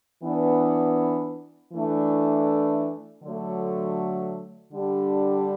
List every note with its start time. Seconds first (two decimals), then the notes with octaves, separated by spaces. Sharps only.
0.24 E3 B3 D4
1.73 E3 A3 D4
3.22 D3 F#3 A3
4.72 D3 G3 D4 G4